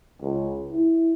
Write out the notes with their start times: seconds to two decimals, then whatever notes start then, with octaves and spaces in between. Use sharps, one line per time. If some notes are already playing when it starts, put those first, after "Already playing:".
0.22 C#2
0.71 E4